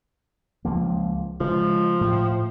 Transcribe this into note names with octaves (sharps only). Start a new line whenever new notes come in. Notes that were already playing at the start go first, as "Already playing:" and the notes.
C#2 F3 A#3
C#3 F3 G#3
A2